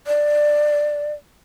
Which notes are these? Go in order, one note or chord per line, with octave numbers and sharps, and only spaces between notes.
D5